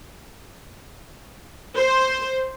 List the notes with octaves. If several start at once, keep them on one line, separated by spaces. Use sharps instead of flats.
C5